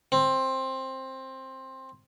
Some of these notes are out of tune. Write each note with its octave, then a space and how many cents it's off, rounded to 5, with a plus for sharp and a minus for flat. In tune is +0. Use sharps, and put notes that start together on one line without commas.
C4 +15